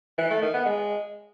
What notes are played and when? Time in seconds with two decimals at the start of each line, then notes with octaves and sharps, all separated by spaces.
0.18 E3
0.30 A3
0.42 D#3
0.54 B3
0.65 G#3